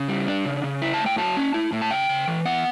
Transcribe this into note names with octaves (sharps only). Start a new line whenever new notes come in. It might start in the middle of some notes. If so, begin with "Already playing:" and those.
Already playing: C#3
G3
D4
C#3
C#3
E4
A5
A2
G5
F#3 A5
C#4
E4
A2
A5
C#3 G5
C#3
E3
B3 F#5